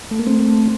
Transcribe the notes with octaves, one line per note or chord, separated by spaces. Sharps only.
A3
A#3
A3 C4